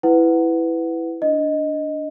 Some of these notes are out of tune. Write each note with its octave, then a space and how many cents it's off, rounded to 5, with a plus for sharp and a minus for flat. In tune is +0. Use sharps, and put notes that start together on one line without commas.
E4 +0 B4 +15 F#5 +0
D4 -10 D#5 +0